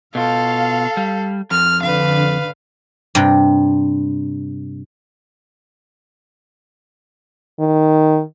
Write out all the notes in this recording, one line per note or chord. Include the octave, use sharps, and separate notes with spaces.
B2 F4 A4 F5
G3
F2 F6
D3 B4 F5
G2 C3
D#3